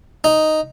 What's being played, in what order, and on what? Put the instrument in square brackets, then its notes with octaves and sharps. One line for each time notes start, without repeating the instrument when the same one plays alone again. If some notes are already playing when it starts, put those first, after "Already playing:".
[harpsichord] D#4